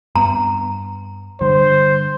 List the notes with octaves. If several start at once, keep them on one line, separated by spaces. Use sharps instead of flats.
G2 B3 A#5
G2 D3 G3 C5